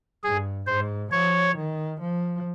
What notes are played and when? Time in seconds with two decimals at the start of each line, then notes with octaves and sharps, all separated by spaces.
0.24 G2 G#4
0.67 G#2 C5
1.11 F3 C#5
1.56 D#3
2.00 F3